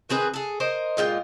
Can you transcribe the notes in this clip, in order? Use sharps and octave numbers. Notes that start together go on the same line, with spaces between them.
D#3 C4 G#4 B4
G#4 A4
A#4 C5 D#5
A#2 G#3 F4 G5